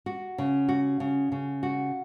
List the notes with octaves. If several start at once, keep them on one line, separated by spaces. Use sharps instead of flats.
F#4
C#3
F#4
C#3
C#3
F#4